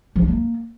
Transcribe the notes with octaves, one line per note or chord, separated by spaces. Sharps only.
F3
D4
A#3